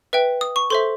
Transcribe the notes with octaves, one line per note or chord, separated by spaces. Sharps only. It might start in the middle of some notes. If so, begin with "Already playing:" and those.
B4 E5 G5
D#6
C#6
A4 C5 E5 C6